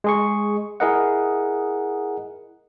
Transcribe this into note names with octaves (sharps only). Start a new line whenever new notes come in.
G#3 G#4 C#6
E4 G#4 A#4 D#5 F#5